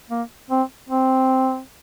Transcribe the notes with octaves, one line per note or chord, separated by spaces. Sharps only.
A#3
C4
C4